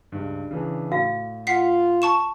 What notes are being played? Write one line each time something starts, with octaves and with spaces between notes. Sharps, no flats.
C#2 G2
C#3 E3 D4
A2 F#4 F5
F4 F#5 B6 C7
A5 C#6 E7